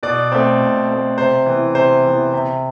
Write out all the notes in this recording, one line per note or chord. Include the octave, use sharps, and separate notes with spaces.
B2 D5
A3 C4
B2
A3 C4
C3 C5
E3 B3
C3 C5
E3 B3
C3